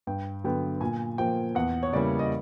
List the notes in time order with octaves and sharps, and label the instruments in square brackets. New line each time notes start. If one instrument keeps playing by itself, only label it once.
[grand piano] G2 G5
D3 F#3 B3 G5
A#2 G#5
F3 A#3 G5
E2 F#5
C#5
C#3 E3 G3 A#3 D5
D#5